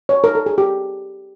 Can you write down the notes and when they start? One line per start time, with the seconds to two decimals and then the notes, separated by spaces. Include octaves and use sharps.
0.09 C#5
0.24 A#4
0.35 A4
0.46 G#4
0.58 G4